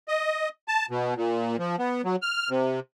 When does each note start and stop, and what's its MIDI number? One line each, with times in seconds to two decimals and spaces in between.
0.08 0.49 75
0.68 0.86 81
0.91 1.14 47
1.17 1.56 46
1.59 1.76 53
1.79 2.02 59
2.05 2.16 54
2.22 2.50 89
2.50 2.80 48